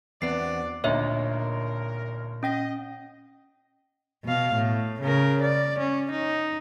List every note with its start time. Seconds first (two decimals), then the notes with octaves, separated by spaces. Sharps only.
0.22 E2 B3 C4 D4 F#4 D5 C7
0.84 G#1 D2 A#2 D#4 A#4 C#5 E5
2.43 C#4 D#5 G5 A#6
4.24 B2 F5
4.54 A2
5.01 C#3 A#4
5.42 D5
5.79 C#4
6.12 D#4